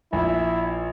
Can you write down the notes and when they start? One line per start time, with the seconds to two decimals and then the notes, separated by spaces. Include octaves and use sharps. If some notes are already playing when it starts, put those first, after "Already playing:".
0.13 A#1 E4